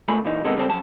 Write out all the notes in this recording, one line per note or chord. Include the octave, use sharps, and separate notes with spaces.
C#2 A#2 A3 G#5 B5
A#2 E3 D#4
C3 D#3 G#3 B3 D#4 A4
C#3 G3 C4 A4
F3 F#3 C#4 A5